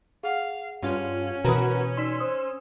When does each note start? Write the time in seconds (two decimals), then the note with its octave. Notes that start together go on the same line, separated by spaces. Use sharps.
0.23 G#4 F5 F#5
0.82 G2 C#4 F4
1.44 B2 E3 F#4 A#4 B4 A#5 B5 D#6
1.97 D#4 D5 C6 E6 B6
2.20 C5 D#6